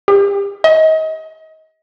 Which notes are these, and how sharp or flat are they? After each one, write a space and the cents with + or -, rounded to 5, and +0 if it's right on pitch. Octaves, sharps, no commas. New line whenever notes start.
G4 +35
D#5 +30